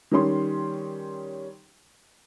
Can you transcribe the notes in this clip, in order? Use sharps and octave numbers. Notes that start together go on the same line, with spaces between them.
D#3 G3 C#4 C6